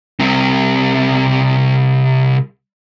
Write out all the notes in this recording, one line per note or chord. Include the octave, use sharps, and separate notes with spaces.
C2 C3